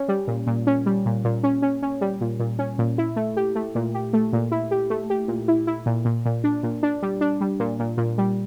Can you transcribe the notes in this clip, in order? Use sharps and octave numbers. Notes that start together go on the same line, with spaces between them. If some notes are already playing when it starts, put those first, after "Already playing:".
Already playing: C#4
G3
A#2
A#2
C#4
G3
A#2
A#2
C#4
C#4
C#4
G3
A#2
A#2
C#4
A#2
E4
A3
G4
A3
A#2
G4
A3
A#2
E4
G4
A3
G4
A#2
E4
E4
A#2
A#2
A#2
D4
A#2
D4
G3
D4
G3
A#2
A#2
A#2
G3